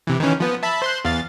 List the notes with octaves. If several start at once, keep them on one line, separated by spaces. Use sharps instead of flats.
C3 E3
D#3 E3 C#4
F3 B3
E5 A5 B5
C5 C6 F#6
E2 F5 A6